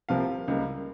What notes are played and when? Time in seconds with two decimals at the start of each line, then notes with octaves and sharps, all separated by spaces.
0.09 C2 C3 F3 A#3 F5
0.48 C#2 C#3 G3 A#3